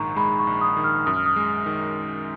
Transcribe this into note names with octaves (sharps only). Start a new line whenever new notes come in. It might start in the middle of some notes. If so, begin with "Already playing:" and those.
Already playing: A#1 G#2 D#3 A#5 C#6
G#3 B5
C#6
A#1
D#6
D#3
F6
F#2 D#6
F6
D#6
G#3
D#3